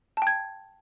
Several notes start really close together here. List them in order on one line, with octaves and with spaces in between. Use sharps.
A5 G5 G#6